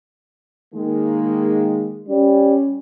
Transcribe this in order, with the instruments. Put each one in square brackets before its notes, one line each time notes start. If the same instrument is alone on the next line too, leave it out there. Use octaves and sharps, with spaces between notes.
[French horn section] D#3 G#3 A#3
[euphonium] G3 [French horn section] C#4